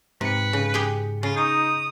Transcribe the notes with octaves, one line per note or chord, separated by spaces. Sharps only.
G#2 C3 B4 C#7
C#3
G4 G#4 G5
C#3 F4
D#4 C#6 D#6 G6